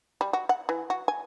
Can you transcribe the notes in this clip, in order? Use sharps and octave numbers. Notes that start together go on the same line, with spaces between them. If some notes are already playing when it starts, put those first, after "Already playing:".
G3
F#4
F#5
E3
F#4
G#5